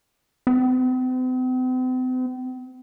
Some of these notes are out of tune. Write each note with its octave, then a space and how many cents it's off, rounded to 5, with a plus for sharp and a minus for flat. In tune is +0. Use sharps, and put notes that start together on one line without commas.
C4 -45